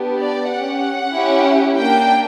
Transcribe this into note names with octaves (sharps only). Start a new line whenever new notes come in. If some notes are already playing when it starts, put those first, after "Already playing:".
Already playing: B3 D4 G4
D5
C#4 G4 F#5
C#4 E4 G4
A#3 D4 G4 G5